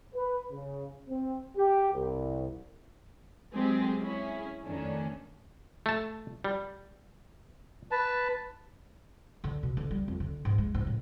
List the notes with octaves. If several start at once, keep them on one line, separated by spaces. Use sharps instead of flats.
B4
C#3
C4
G4
C2
F#3 G#3 C4 G4 G#4
C#4 E4 G#4
F2 D#3 A3 C#4 D4
A3 A5
G3
B4 A5
D3
B2
D3
G3
F2
D3
G#2
G#3
G#2
A2